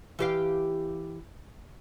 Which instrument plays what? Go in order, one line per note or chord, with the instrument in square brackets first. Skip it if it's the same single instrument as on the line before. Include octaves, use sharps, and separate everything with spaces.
[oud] E3 G4 F5